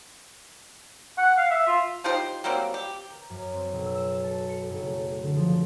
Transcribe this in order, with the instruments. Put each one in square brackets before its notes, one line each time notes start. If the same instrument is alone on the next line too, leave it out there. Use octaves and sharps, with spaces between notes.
[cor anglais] F#5
F5
E5
F4
[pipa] D#4 F4 G4 C5
F#3 G3 A#3 C4
G4
[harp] A#4
F#2
C4
B1
E6
E7
A4
C#7
F#1
A3
D3
F3